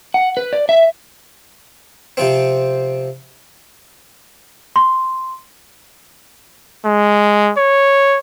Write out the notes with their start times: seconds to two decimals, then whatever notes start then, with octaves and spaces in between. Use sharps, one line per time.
0.14 F#5
0.37 B4
0.53 D5
0.69 E5
2.17 C3 F3 C4
4.76 C6
6.85 G#3
7.57 C#5